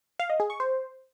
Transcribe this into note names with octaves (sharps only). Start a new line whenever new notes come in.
F5
D#5
G#4
C#6
C5